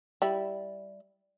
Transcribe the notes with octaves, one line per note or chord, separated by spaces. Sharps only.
G3 E4